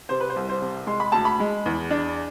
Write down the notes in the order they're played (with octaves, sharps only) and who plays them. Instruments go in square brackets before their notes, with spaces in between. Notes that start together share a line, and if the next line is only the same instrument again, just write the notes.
[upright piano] C3 C5
B4
C5
C2
C5
C3
G#3 C6
B5
D2 A5
B5
G#3
E2
D4